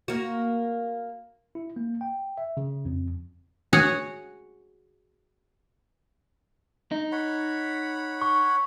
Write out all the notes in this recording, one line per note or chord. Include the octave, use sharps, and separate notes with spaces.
A#3 F#4
E4
A#3
G5
E5
C#3
F2
F#4 G#4 C#5 F#5
D#4
C#5 F#5 B5
C#6